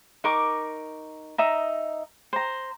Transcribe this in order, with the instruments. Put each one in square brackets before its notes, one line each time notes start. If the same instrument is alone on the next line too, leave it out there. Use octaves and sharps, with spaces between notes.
[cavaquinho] D#4 A#4 C#6 D6
D#4 D#5 E5 A#5
C5 A#5